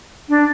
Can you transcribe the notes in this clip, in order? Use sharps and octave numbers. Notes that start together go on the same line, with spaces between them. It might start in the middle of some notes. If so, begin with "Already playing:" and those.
D4